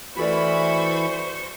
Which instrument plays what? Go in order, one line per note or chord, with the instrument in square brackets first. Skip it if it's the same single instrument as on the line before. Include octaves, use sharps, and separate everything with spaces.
[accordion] E3 B5 [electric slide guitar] F#4 A4 D5 [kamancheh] C5 C#6